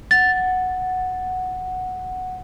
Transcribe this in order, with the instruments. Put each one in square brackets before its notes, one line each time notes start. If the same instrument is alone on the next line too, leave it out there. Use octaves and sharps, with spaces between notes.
[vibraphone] F#5 [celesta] A6